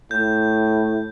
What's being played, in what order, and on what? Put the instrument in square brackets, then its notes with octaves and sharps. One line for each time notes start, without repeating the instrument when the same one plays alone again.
[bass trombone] A2 [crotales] G6